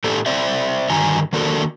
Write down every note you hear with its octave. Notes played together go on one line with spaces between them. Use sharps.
A2 A3 D4 G4 A4
C4 C5 D5 E5
G2 D3 D#3 F#4 G#5 A#5
D#3 A#3 D4 F#4 A4 A#4